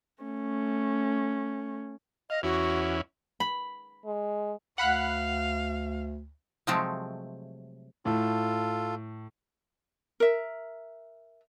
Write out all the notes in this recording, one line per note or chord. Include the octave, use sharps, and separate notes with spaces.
A3 C#4
D#5 F5
E2 C#4 E4 F#4
B5
G#3
D2 F5 F#5 B5 F#6
C3 F3 F#3 G#3 A3 C4
A2 F4 A4
A#4 E5